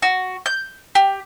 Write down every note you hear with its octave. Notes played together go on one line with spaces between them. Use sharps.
F#4
G6
G4